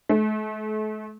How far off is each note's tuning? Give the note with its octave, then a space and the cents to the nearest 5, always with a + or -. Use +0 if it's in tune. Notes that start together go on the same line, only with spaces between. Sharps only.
A3 -40